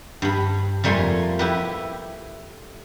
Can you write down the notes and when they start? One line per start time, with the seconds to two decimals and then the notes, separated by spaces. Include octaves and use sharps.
0.22 G2 B5
0.84 F2 G3 A3 A#3 G#5 C6
1.39 E4 G4 B4